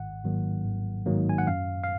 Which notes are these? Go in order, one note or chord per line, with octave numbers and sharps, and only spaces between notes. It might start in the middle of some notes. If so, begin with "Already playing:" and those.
Already playing: G#1 F#5
G#2 D#3 F#3 A#3
G#1
G#2 D#3 F#3 A#3
G#5
F#5
F#2 F5
F5